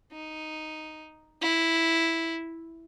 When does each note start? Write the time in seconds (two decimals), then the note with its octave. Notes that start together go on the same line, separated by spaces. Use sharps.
0.12 D#4
1.42 E4